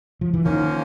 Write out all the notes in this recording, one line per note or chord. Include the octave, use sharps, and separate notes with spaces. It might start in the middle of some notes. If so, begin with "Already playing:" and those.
F3
E3
D#3 F3 A#3 C#4 F#4 A#4